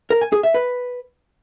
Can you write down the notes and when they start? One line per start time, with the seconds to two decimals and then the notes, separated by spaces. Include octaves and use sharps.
0.10 A#4
0.21 G#5
0.32 G#4
0.43 E5
0.54 B4